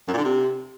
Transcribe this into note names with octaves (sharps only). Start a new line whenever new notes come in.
F#2
A#2
D3
C3